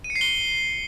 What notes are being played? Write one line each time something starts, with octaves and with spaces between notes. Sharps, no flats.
D#7
C#7
C7
G7